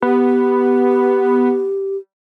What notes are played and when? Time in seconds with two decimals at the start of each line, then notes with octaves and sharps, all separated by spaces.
0.02 B3 G4